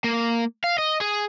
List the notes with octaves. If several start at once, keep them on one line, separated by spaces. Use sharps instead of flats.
A#3
F5
D#5
G#4